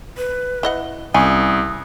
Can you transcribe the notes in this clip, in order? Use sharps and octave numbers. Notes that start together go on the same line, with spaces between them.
B4
E4 D#5 F#5
C2 C#4 G#5 D#6